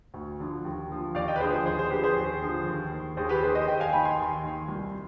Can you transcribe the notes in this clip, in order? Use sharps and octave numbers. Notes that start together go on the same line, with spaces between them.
D2
D3 F3
D#2
D3 F3
D#2 D5 F5
D#5 G5
B4
D3 F3 G#4 C5
G#4 C5
D#2 G#4 C5
G#4 C5
D3 F3 G4 B4
G#4 C5
D#2
D3 F3
D#2
D#3
D#2 G#4 C5
G4 B4
D#3 G#4 C5
C5 D#5
D#2 D#5 G5
F5 G#5
D#3 G5 B5
G#5 C6
D#2
D#3
C2